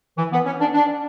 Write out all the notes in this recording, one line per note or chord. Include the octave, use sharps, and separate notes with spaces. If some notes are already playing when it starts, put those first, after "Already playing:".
E3
B3
C#4
D4
D4